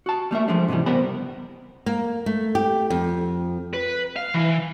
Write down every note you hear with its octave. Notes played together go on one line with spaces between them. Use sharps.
F#4 A5
G3 A3 A#3 E5
F3 G#3 A3 D4
G#2 C3 D#3 E3 G3
C#2 G3 B3 A#4 C5 B5
A#3
A3
G4
F2
B4
F5
E3